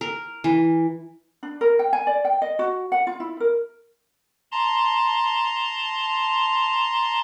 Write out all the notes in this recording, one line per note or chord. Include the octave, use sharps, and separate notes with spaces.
A#4
E3
D4
A#4
G5
G#5
D5
G5
D#5
F#4
F#5
F4
E4
A#4
A5 A#5 C6